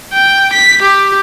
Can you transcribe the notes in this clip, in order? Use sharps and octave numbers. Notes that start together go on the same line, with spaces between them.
G5
B6
G4